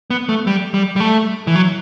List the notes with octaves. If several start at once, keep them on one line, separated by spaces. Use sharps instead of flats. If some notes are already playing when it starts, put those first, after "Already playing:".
B3
A3
G3
G3
G3
A3
E3
F#3